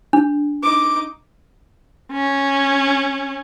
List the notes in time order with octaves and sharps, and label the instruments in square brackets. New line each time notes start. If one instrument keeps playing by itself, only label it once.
[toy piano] D4
[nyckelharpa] D#4 D6
[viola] C#4